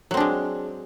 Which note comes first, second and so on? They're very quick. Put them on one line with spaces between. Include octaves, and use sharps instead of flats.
F#3 C4 D4 G#3